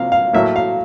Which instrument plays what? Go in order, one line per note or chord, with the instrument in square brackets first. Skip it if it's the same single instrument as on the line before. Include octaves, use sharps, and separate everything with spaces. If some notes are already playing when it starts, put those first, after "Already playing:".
Already playing: [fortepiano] C3 F3 A#3 F5
F5
A2 F#3 A#3 E5
F5